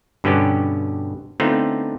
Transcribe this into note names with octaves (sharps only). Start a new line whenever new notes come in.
G2 B2 D3 B3 C#4 G4
D3 A3 B3 C4 D#4 F4